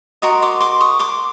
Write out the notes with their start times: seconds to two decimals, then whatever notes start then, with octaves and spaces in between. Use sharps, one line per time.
0.22 F#4 A#4 D#5 A#5 C6
0.42 C6 D6
0.61 C6 D6
0.81 C#6 D#6
0.99 C6 D6